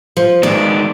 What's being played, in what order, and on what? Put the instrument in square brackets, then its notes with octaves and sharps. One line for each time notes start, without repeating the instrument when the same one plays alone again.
[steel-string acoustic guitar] F3
[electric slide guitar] D#3 G#3 B3 [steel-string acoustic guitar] D5